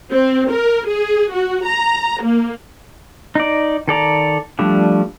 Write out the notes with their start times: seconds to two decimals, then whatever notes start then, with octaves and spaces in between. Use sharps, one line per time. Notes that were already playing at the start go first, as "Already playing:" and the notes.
0.11 C4
0.52 A#4
0.87 G#4
1.32 F#4
1.66 A#5
2.23 A#3
3.35 D#4 D5
3.88 D#3 A4 D5 A#5
4.59 F3 G3 A3 D4